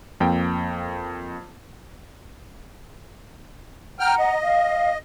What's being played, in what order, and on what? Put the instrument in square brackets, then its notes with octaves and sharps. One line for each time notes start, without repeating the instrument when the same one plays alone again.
[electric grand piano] F2 A#3 G5
[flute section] F#5 A#5 [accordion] G5 F6
[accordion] D#5
[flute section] F5